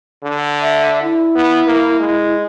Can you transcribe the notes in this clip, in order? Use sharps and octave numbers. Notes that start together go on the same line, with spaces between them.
D3
E5
E4
B3
A#3
G#3